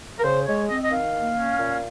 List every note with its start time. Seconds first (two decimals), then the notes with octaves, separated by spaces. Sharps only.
0.19 A#4
0.23 C#3 C5
0.47 G#3 C#5
0.69 C4 D#5
0.83 D#5
0.91 D#3 F5
1.14 A#3
1.37 C#4
1.59 A#2